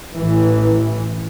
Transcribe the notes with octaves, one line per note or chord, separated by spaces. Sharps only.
A1 E3